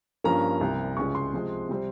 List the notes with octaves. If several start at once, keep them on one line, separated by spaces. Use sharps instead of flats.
G2 F3 A#3 C#4 A#5
C2 C3 G3
C#2 C#3 G#3 C#4 C#6
C6
C3 F3 G#3 C4
C3 G3 C4